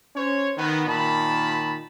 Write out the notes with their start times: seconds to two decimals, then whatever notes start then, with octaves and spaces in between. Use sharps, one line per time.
0.15 C#4 C5 C#5
0.57 D#3 B3
0.87 A#2 D#3 A5 B5